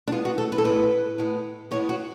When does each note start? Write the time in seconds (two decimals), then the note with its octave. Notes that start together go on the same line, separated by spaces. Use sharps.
0.08 D4
0.11 A2 G#3 B3 F4
0.25 F#4
0.38 A4
0.52 B4
0.58 A4
0.65 A2 G#3 B3 B4
1.18 A2 G#3 B3
1.71 A2 G#3 B3 C#5
1.89 F#4